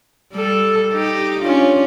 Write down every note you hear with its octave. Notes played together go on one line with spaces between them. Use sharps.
G3 A4
D#4 G4
C#4 D4 F4